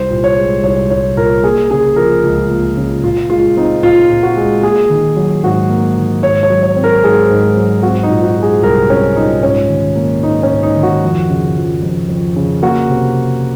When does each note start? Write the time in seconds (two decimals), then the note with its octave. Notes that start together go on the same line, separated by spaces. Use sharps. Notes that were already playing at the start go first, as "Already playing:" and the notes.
Already playing: C2 C5
0.10 A#2
0.24 C#5
0.37 G#3
0.63 C2 C#5
0.90 C2 C#5
1.16 A#2 A#4
1.43 A#3 G#4
1.71 C#3 G#4
1.96 F3 A#4
2.24 C#2
2.50 A#3
2.77 C#3
3.03 A#2 F4
3.30 G#3 F4
3.56 C4 D#4
3.83 A#2 F4
4.10 A#2
4.23 F#4
4.37 G#3
4.63 A#3 G#4
4.90 D#3
5.16 F#3
5.43 G#2 F#4
5.70 A#3
5.97 D#3
6.23 G#2 C#5
6.43 C#5
6.50 F#3
6.63 C#5
6.76 C4
6.84 A#4
7.03 G#2 G#4
7.30 G#2
7.57 F#3
7.83 C4 F#4
8.03 D#4
8.09 A#2
8.23 F#4
8.36 G#3
8.42 G#4
8.62 C2 A#4
8.89 C4 C#4
9.16 A#2 D#4
9.42 G#2 C#4
9.69 D#3
9.95 A#3
10.22 G#2 D#4
10.43 C#4
10.50 G#2
10.63 D#4
10.77 D#3
10.83 F#4
11.03 F2
11.30 C#3
11.57 F3
11.82 F2
12.09 F2
12.36 C#3
12.62 A#3 F#4
12.90 C3